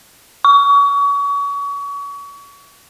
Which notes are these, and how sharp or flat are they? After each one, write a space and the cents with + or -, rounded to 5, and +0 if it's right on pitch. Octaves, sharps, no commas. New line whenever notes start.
C#6 +35